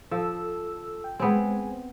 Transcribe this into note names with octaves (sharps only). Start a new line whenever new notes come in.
F3 A4 E6
G5
G#3 B3 C4 C5 G#5